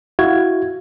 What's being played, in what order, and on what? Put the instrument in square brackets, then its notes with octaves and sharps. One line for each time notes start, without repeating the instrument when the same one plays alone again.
[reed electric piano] E4 F#4 F5 G#6